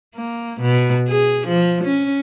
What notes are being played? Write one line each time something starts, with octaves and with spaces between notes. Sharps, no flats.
A#3
B2
G#4
F3
C#4